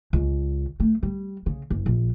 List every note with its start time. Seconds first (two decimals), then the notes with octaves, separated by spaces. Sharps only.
0.13 C#2
0.80 A3
1.03 G3
1.46 C#3
1.70 F#1
1.86 A#1